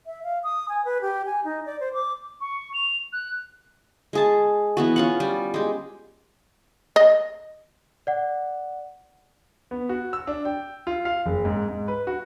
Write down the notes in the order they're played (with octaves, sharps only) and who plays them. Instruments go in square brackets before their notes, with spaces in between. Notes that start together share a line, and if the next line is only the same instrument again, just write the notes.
[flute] E5
F5
D#6
G#5
B4
G4
G#5
D#4
D5
C5
D6
[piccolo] C#6
F7
F#6
[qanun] G#3 G#4 A5
E3 B3 F#4
C#4 F4 F#5
G3
G#3 G4
[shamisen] D#5
[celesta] D5 F#5
[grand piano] B3
F#4
E6
D4
G5
F4
F5
F#1
G#2
G#2
B4
F#4